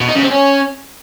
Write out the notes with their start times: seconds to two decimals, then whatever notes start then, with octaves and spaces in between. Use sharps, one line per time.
0.01 B2
0.08 D#4
0.15 C#3
0.23 C4
0.30 C#4